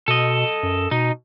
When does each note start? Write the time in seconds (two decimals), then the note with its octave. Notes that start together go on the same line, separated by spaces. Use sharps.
0.08 B2 A4 D#5
0.63 F#2
0.91 B2 D#4